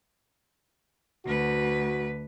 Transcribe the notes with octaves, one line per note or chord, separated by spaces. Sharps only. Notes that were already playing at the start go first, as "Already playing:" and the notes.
D2 F#4 B4